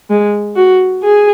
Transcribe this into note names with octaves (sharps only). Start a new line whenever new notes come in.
G#3
F#4
G#4